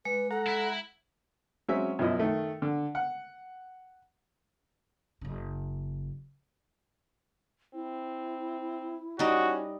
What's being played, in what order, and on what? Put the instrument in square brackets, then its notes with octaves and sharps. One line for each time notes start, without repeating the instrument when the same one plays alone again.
[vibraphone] G#3 [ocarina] B4
[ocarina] A4 [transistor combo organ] F#5 A#5
[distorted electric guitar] E4 E5
[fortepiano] F#3 G#3 C4 C#4 E5
F#2 B2 F3 E4 D#5
D#3 A3
D3
F#5
[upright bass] F#1 C#3
[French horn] C4 [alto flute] E4
[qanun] G3 D#4 [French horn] C#4 [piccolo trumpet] F#4